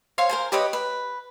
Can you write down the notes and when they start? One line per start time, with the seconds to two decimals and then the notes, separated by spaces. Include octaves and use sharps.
0.18 C5 C#5 F5 G#5
0.29 A#4 C5 G#5
0.52 G4 B4 C#5 D#5
0.73 B4